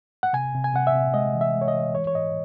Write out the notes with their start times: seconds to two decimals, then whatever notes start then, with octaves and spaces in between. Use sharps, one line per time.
0.23 F#5
0.33 C3 G#5
0.54 C3
0.64 G#5
0.74 C3 F#5
0.87 E5
0.95 C3
1.14 G#3 D#5
1.34 E3
1.41 E5
1.55 G#3
1.61 C#5
1.68 D#5
1.74 E3
1.94 E3 C#5
2.07 C#5
2.14 G#2 D#5